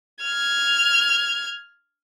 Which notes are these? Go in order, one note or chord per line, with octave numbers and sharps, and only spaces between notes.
F6 G#6